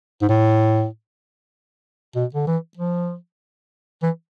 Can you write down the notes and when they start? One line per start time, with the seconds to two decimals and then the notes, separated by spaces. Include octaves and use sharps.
0.22 G#2
0.29 A2
2.16 B2
2.35 D3
2.47 E3
2.77 F3
4.03 E3